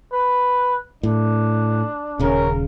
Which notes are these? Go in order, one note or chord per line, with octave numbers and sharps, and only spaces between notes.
B4
A2 D4
D#1 C#3 C#4 A#4